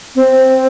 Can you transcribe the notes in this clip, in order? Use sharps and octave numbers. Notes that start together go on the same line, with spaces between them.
C4